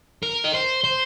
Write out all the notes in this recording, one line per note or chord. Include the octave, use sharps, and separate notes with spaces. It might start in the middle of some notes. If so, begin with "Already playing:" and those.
A#4
D#5
C5
C5